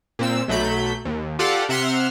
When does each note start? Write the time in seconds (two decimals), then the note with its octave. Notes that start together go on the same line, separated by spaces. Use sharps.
0.19 A#2 C4 E6
0.48 B1 F#3 A3 B5 G6
1.05 D#2
1.39 F4 G4 A4 D5 F5 F#5
1.69 C3 E5 F#5 C6 F6